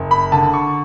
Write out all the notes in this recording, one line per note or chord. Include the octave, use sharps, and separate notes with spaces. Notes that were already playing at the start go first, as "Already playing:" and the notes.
Already playing: F#1
B5
D3 A5
C#6